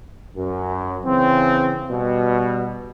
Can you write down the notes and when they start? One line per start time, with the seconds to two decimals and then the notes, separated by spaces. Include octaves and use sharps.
0.36 F#2
1.05 C#3 E3 C4
1.90 B2 G3